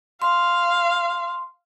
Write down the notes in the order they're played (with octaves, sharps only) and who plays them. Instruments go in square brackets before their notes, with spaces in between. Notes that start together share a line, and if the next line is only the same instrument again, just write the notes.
[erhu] F5 [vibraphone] C6